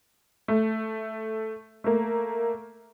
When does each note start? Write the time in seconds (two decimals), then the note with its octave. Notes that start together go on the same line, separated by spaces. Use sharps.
0.48 A3
1.84 A3 A#3